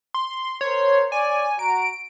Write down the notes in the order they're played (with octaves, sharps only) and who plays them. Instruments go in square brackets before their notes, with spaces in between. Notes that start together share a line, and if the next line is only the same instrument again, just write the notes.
[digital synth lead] C6
[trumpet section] A#4 C5 C6 [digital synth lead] C#5
[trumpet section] C#5 D5 [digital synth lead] G#5
[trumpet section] F#4 A#5 [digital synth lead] D7